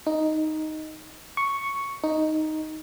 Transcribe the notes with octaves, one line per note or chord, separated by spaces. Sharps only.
D#4
C#6
D#4